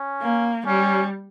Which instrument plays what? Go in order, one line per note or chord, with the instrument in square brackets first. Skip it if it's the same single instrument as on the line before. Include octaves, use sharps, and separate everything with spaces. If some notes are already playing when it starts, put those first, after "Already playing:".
Already playing: [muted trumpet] C#4
[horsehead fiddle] A#3
[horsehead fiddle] G3 [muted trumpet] C#4